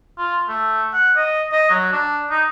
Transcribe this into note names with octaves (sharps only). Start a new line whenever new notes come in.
F4
A3
F#5
D#5
D#5
F#3
D4
D#4